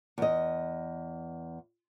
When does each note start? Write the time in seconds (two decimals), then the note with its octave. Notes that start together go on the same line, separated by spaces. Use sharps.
0.18 E2 D#5